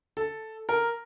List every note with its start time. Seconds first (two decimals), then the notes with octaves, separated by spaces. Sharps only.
0.17 A4
0.69 A#4